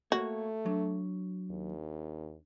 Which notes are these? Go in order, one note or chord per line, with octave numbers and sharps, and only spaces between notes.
A3 A#3 F#4 C#5
F#3 D4
D#2